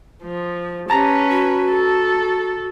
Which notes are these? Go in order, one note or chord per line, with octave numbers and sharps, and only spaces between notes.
F3
C#4 G4 B4 A5 A#5
F#4
A4